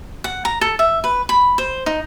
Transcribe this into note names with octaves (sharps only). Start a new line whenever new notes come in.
F#5
A#5
A4
E5
B4
B5
C5
D#4